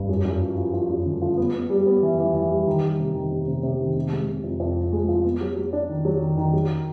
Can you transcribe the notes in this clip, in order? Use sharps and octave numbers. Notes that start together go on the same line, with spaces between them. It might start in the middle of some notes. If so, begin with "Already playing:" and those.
Already playing: G2
F#2
F#2
F3
F3
F3
F#2
D3
F3
B3
B3
G3
B3
E3
E3
E3
G3
D#3
G3
C3
D#3
C3
C3
C3
D#3
C3
G#3
C3
F2
F2
F3
G#3
F3
B3
F#3
F#3
D4
D#3
F#3
D#3
D#3
F#3